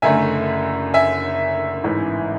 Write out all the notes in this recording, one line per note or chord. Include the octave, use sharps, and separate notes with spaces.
F#1 F#2 D3 A3 E5 G#5
E5 G#5
A1 G#2 E3